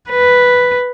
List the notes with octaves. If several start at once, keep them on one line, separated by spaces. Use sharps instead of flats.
B4